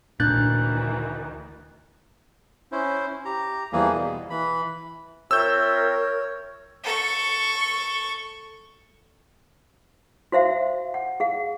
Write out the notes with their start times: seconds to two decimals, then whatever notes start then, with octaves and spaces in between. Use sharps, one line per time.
0.20 D2 A#2 D#3 E3 D4 F#6 G6 A6
2.72 C#4 E4 C5
3.25 G4 A#5
3.72 E2 E3 F3 G3 A#3 G#4
3.93 B2
4.30 E3 B5
5.31 C4 F4 A#4 C#5 E5 E6 G6
6.84 A4 C#6
10.32 F#4 C5 E5 F5
10.94 F#5
11.20 G#4 F5